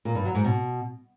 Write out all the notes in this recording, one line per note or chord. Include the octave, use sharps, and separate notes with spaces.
A#2
G2
F#3
G#2
B2